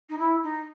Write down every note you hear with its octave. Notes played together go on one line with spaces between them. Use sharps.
D#4
E4
D#4